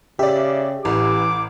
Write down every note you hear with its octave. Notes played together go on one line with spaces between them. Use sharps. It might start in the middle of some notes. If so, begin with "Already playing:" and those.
C#3 G4 D5 E5
A1 E3 D6